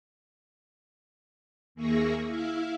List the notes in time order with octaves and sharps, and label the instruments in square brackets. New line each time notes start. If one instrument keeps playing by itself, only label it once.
[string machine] D#2 A#3 G#4 E5 C#6 A#6
E4 E5 F5